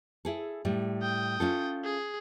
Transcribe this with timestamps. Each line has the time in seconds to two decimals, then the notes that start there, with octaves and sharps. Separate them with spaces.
0.25 E4 G#4 A4
0.65 A2 G3
1.02 G5 D#6
1.40 C#4 F4 A4
1.84 G#4